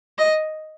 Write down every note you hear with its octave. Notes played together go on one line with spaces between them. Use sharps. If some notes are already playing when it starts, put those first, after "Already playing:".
D#5